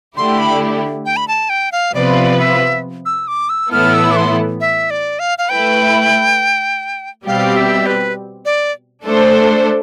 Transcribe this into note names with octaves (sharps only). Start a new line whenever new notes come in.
D3 A3 E4 G4 C6
B5
G5
B5
A5
G5
F5
C3 F3 B3 F4 B4 D5
E5
E6
D6
E6
A2 E3 B3 E4 A4 F6
E6
D6
C6
E5
D5
F5
F5
A3 E4 B4 G5
B2 G3 C4 G4 F5
E5
B4
D5
A3 D4 A4 C5